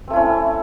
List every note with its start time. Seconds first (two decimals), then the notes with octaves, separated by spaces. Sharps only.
0.08 C4
0.10 A3
0.13 E4
0.16 C#4